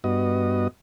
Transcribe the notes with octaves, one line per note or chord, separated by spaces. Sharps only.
G2 B3 F#4 D#5